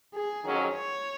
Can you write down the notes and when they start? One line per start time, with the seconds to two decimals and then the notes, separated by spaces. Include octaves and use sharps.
0.15 G#4
0.44 F2 D#3 F#3 C#4
0.74 C#5